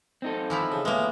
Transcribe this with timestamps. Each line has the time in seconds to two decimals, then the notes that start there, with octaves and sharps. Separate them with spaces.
0.22 C4 D#4 A4
0.50 E3 F3 E4
0.72 C#3
0.85 A2 G#3 A#3 B3